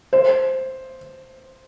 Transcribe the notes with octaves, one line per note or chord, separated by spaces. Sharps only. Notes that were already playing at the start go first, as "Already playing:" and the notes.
C5